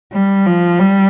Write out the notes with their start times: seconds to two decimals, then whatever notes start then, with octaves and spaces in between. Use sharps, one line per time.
0.13 G3
0.46 F3
0.79 G3